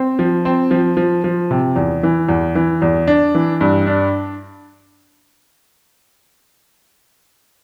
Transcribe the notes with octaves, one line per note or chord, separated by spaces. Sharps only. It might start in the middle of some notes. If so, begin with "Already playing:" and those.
Already playing: C4
F3
C4
F3
F3
F3
C3
E2
E3
E2
E3
E2
D4
E3
G2
D4